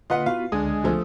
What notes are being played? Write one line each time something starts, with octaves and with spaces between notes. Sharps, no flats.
D3 A#3 F4 B4 D#5 F#5
B3 E4 F#4 F5
C#2 D3 G#3 D4 G#4 G#5 D#6
F3 A3